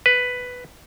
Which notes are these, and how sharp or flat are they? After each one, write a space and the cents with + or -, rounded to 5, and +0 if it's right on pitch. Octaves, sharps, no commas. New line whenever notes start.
B4 +5